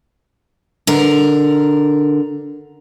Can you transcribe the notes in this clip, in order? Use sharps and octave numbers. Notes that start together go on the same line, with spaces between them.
D3 A#4